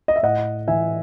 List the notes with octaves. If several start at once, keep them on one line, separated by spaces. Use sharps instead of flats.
D#5
E5
A2 D#5 F#5
E3 E5 G#5